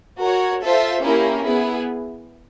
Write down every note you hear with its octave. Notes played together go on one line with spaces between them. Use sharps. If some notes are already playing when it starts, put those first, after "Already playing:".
F#4 A#4 C#5
F4 A4 C5 E5
A#3 C#4 E4 G4 A#4
B3 E4 G#4